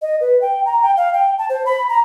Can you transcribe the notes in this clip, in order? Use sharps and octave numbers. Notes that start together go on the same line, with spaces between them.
D#5
B4
G5
A#5
G5
F5
G5
A5
C5
B5
A#5